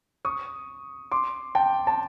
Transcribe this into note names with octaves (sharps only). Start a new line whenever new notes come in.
C#6 D#6
C6 D6
G5 A5
A5